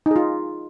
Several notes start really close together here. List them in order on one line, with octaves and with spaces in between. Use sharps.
D#4 G#4 F4